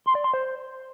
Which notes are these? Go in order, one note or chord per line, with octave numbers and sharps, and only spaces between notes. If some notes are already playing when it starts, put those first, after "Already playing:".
C6
D5
C6
C5